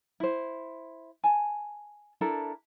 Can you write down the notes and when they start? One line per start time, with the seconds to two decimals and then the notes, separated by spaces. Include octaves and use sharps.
0.20 E4 C5
1.24 G#5 A5
2.21 D4 E4 A4 A#4